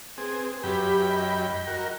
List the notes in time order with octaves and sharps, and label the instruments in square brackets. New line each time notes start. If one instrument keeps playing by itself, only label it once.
[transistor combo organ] C4 G#4 [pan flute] B4
[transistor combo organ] F#2 G5 B5 [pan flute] G4
[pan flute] D#5
[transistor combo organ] F#4 A#4